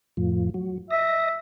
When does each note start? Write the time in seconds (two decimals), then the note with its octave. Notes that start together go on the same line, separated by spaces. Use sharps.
0.17 F2 A2 F3
0.54 F#3
0.91 D#5 E5 A#6